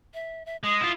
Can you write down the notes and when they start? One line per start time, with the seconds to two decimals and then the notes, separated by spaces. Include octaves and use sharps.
0.14 E5
0.46 E5
0.63 G#3 D#6
0.81 E4 F4